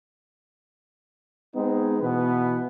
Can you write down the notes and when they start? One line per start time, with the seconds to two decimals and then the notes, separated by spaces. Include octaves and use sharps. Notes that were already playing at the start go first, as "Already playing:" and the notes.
1.55 G#3 B3 C4 D#4
2.00 B2 E3 B3 B4